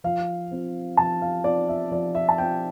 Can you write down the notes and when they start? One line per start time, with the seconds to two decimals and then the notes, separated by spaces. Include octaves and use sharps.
0.04 F3 F5
0.51 C4 F4
0.97 F3 A5
1.22 F5
1.44 C4 F4 D5
1.69 E5
1.91 F3 D5
2.15 E5
2.29 A5
2.38 C4 F4 G5